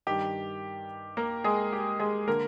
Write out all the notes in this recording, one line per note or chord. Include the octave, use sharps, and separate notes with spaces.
G2 D#3 G4
A#3 A#4
G#3 G#4
G4
G#3 G#4
D3 A#3 A#4